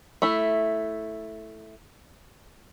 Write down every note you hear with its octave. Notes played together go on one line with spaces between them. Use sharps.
A3 E4